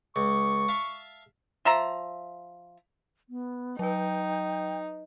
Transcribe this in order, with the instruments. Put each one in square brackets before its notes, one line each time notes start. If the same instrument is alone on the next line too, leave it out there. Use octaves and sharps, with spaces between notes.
[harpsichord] C#2 [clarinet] C#6
[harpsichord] E5 F5 A5
[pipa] F3 E5 A#5
[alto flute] B3
[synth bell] F#3 B4 [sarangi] D#4 [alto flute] G5